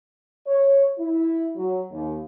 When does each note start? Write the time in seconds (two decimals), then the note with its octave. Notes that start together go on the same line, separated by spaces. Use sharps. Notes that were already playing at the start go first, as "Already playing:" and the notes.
0.47 C#5
0.98 E4
1.56 F#3
1.91 D#2